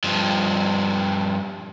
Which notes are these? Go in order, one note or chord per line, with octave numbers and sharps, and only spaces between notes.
G2 F3